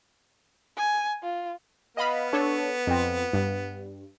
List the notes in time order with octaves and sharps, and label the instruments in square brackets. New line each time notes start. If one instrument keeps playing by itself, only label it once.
[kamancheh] G#5
F4
[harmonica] B3 [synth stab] D#5 F5 B5
[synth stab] D4 A4 C#5
F2 C4
G2